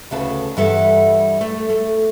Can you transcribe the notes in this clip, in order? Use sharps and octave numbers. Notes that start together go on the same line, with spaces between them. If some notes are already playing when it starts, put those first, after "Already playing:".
D2 C#3 B4 A5
G2 E3 G3 A4 E5 F#5
A3
A3